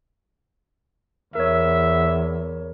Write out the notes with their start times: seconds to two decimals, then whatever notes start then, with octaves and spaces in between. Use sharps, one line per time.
1.35 E2 A#4 C#5 E5